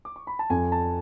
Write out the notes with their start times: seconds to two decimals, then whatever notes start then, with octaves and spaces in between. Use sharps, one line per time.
0.05 D6
0.16 C#6
0.27 B5
0.39 A5
0.50 F2 G#5
0.72 A5